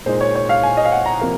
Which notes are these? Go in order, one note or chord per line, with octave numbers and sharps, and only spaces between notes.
A#2 G#3 D#4 C5
C#5
C#5
F5
G#5
D#5
F5
F#5
A#5
C3 F3 A#3